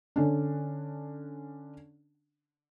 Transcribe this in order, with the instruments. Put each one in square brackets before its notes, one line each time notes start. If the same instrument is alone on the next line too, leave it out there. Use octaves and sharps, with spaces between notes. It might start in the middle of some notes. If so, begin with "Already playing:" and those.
[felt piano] D3 C#4 D4